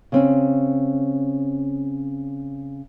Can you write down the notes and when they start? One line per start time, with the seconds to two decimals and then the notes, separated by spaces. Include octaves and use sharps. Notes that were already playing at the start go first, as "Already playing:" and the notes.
0.12 C#3 C4 C#4